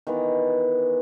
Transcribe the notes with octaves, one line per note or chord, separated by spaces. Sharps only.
D#3 E3 B3